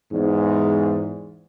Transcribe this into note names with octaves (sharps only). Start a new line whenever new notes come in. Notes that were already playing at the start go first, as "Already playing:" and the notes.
E2 G#2